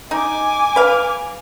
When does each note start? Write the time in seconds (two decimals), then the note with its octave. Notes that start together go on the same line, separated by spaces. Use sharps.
0.11 D#4 G#5 D6
0.76 B4 F5